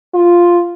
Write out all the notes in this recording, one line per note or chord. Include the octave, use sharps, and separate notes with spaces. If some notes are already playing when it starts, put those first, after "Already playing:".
F4